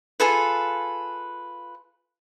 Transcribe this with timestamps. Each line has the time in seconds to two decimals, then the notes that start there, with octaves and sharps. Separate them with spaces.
0.20 F4 G#4 A4 B4